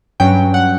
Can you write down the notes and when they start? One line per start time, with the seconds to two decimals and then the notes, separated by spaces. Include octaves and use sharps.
0.20 G2 F#3 C#4 G5
0.54 F#5